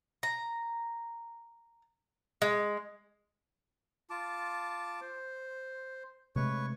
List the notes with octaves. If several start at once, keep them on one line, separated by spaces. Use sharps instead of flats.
A#5
G#3
F4 A5 D6
C5
C3 G#3 A3 B4 C#5 C#6